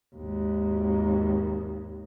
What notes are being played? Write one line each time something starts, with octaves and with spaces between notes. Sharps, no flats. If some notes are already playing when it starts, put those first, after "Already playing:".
G#1 D#2